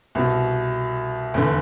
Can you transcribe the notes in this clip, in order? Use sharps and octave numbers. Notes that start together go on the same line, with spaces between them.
C2 B2
F1 E2 D3